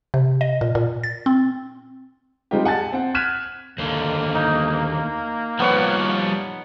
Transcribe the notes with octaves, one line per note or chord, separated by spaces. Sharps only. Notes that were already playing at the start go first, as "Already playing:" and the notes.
C3
D#5
A#2
A#2
A6
C4
G3 G#3 C4 D#4 F4 G4
F#5 G#5 A5 A6
C4 F#5
F6 F#6 G#6 B6 D#7 E7
D#2 D3 A#3
D#4
F3 G3 B3 C#5 F#5